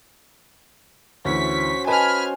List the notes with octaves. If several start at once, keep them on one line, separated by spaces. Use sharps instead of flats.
D2 E3 C#4 F#4 C5 C#6 B6
B4 D#5 G#5 A5 B5 F6